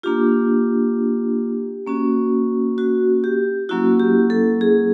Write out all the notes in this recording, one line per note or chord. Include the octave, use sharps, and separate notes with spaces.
A#3 D4 F4 G4
A#3 C#4 F#4
F#4
G4
F#3 A#3 C#4 E4 F#4
G4
A4
G#4